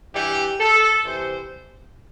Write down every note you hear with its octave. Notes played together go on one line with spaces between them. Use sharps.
G2 E3 G3 G4
A4
C3 E3 G3 C5